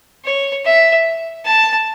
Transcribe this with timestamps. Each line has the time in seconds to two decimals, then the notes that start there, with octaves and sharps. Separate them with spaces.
0.25 C#5
0.65 E5
1.45 A5